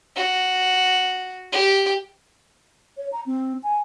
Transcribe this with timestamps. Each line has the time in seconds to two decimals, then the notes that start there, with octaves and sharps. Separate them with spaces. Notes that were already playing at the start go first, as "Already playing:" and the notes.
0.16 F#4
1.52 G4
2.97 C#5
3.12 A#5
3.26 C4
3.63 G#5